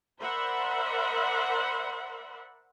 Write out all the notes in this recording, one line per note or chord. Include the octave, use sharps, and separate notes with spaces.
A#4 C5 D5 E5 F#5 B5